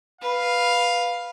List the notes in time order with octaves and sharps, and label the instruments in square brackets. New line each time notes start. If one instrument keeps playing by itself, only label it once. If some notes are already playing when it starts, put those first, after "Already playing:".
[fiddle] B4 [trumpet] F5